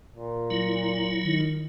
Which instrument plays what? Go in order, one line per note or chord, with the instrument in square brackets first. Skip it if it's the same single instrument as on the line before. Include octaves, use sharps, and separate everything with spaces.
[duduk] A#2
[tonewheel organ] F#3 E4
[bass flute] D#3